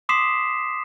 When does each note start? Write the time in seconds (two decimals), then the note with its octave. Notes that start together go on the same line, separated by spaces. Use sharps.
0.09 C6 D6 D#6 B6 C7 E7